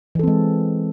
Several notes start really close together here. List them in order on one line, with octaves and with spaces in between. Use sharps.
E3 A4 C4 G#3